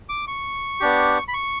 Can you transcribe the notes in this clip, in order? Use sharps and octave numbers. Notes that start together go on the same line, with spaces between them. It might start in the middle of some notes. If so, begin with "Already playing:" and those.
D6
C#6
B3 D4 G4
B5
C#6